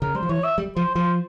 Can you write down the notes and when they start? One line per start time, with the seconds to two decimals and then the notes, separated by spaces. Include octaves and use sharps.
0.02 C#3 A#4
0.15 G3 C5
0.23 F3
0.29 E3 C#5
0.44 E5
0.58 G3
0.76 F3 C5
0.95 F3 C5